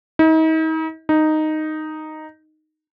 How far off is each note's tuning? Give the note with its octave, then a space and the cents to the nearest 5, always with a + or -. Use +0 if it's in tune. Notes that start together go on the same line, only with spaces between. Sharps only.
D#4 +40
D#4 -5